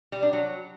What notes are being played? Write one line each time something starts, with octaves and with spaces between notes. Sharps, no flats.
G3
D4
F#3